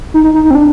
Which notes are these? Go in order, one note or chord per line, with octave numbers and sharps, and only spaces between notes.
D#4
D#4
D#4
D#4
C4
D4